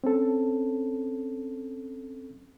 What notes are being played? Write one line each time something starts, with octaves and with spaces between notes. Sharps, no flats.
C4 C#4 A4